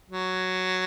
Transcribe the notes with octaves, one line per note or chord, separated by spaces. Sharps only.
F#3